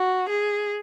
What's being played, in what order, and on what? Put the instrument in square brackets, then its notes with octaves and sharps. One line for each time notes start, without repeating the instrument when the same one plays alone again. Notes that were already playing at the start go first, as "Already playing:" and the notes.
Already playing: [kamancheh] F#4
G#4